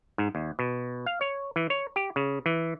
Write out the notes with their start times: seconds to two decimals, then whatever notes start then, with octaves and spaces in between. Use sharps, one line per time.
0.18 G#2
0.35 D#2
0.59 B2
1.06 F5
1.21 C#5
1.56 E3
1.70 C#5
1.96 G4
2.16 C#3
2.46 E3